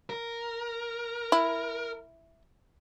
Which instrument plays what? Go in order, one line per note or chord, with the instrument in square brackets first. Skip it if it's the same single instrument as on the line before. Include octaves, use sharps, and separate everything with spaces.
[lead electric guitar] A#4
[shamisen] E4